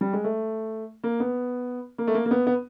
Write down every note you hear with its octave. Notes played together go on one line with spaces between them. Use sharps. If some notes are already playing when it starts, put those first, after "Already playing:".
G3
G#3
A3
A#3
B3
A#3
A3
A#3
A#3
B3
B3